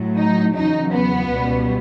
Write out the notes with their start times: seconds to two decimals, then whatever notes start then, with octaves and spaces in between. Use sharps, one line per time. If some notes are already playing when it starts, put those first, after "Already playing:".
Already playing: A2 F#3
0.18 D#4
0.55 E2 C#3 F#3 D#4
0.92 B3
1.30 C#2 B2 G3